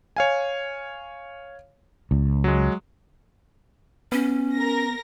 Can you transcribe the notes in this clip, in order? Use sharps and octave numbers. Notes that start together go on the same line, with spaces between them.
C#5 F5 G#5
C#2
F#3 G#3
B3 C#4
A#4 A#6